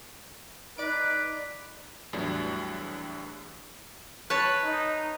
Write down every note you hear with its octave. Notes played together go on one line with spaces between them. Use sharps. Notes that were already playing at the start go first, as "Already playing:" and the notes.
D#4 B4 D5 D7
E2 A2 F#3 G3 D4
B4 C#5 A5
D#4